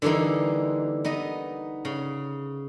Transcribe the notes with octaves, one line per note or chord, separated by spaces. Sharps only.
D3 E3 G3 A#3 D#4
B3 D#4 D#5
C#3